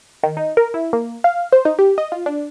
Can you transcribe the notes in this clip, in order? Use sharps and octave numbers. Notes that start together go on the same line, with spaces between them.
D#3
D#4
A#4
E4
A#3
F5
C5
D#4
G4
D#5
F4
D4